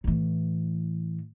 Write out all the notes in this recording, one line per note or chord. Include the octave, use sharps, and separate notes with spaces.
A2 E3